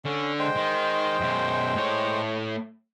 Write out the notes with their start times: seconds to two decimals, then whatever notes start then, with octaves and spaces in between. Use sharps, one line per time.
0.05 D3 C#4
0.39 G#3 C5 G5
0.57 D#3
1.21 F#2 B2
1.76 A2 C#5